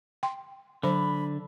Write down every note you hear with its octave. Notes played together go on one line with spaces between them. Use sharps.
G5 C6
D3 F#3 C5 B5